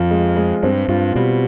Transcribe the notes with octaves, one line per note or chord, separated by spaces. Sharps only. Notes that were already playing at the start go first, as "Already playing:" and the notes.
Already playing: F2 F3 F4
G#3
G#3
G2 C4
G2 F4
B2 G3